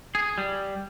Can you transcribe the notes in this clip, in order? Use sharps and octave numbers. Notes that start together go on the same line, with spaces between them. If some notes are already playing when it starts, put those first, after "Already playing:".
G#4
G3